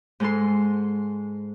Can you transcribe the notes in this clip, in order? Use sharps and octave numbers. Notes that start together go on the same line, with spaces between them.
G#2 G#3 A4 C6